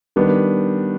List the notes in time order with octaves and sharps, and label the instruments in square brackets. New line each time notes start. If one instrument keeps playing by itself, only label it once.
[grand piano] D#3 G3 B3 D4